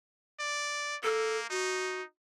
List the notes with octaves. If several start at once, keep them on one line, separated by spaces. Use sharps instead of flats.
D5
A#3 A4
D#4 F#4